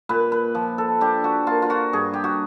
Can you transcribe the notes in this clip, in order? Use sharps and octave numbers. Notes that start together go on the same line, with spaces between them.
A#2 B4
B4
F3
A4
D4 G4
F#4
A#3 F4
F4
F#4
G2 G#4
G4
F#4